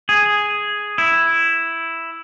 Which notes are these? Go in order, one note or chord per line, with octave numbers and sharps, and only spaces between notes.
G#4
E4